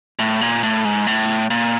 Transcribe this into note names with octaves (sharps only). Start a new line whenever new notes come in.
A2
A#2
A2
G#2
A2
A#2